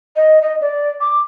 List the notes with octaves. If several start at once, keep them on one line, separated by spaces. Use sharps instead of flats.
D#5
D#5
D5
D6